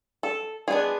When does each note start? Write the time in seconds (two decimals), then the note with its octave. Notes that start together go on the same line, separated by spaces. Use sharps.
0.23 A4
0.68 G#3 B3 D4 G#4